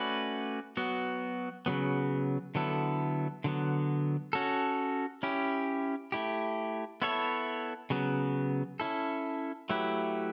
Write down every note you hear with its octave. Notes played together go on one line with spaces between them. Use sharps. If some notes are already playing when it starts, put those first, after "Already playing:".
Already playing: A3 C#4 F#4 B4 D5
F#3 B3 F#4
C#3 F#3 B3
D3 F#3 B3 E4 A4
D3 F#3 B3
C#4 F#4 A4
C#4 E4 G4
A3 E4 G4
B3 E4 A4 C#5 E5
C#3 F#3 B3
C#4 E4 A4
F#3 A3 E4 G4 B4